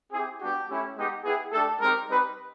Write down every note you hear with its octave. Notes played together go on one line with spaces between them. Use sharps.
C4 E4 G4 G#4
G3 B3 D4 F#4 G4
A3 C#4 E4 G4
G#3 B3 D#4 G4
B3 E4 G4 G#4
A3 D4 G4 A4
G#3 C4 D#4 G4 A#4
G3 C4 D#4 G4 B4